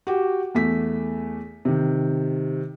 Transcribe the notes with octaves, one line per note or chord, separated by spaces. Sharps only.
F#4 G4
E2 A3 B6
C3 D#3